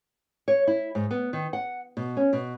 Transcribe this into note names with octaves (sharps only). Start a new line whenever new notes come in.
C#5
E4
G#2
B3
D#3
F#5
B2
C#4
B2